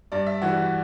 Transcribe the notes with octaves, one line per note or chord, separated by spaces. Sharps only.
G2 D5
E5
E3 G3 F#4
F#4